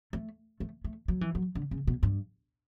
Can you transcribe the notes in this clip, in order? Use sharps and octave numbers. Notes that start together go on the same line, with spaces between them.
A3
A3
A3
F#3
E3
F#3
D3
C#3
B2
G2